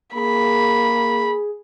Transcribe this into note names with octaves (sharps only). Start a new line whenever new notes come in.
A#3 G#4 B5